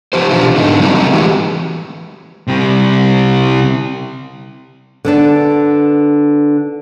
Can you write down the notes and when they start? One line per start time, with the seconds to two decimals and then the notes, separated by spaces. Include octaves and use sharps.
0.13 F3 G4 C5
0.31 B2 E3 D4 F4 G4
0.56 G#2 D3 D#4
0.79 F#3 G3 C4 D4 D5
0.94 F#3 A3 C4 D#4
1.11 A2 E3 G#3 F#4 G4
2.48 C3 G3
5.05 D3 B3 D4